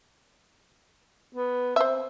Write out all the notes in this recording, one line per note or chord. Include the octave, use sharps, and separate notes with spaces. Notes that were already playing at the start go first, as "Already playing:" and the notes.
B3
C4 C5 E5